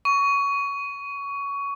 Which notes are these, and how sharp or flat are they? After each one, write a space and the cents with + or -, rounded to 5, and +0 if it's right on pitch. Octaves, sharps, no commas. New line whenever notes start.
C#6 +20